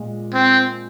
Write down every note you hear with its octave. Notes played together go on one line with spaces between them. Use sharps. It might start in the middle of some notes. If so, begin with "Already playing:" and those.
Already playing: A#2 G#3
C4